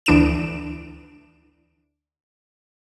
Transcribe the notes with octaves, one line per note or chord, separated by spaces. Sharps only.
D2 E3 D4 D7 E7